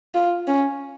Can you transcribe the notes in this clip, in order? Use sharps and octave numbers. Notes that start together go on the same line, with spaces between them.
F4
C#4